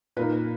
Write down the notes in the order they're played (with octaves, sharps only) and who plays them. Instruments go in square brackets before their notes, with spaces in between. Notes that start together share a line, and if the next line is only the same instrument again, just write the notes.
[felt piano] A#2 A#3 D#4 B4